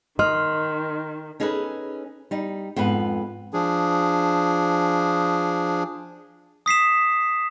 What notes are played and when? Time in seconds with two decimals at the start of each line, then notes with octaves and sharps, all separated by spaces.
0.19 D#3 D#5 C6 F6
1.40 C#4 D#4 G#4 A4 B4
2.31 G3 D#4
2.76 F2 G#2 B3 B4
3.53 F3 D4 G#4
6.66 D#6 B6 C7 E7